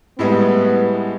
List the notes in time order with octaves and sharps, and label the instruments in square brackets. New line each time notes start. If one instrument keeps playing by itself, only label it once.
[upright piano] A2 G3 G#3 [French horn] B3